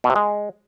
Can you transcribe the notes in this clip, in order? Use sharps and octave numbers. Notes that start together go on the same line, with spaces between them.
B2
C3
G#3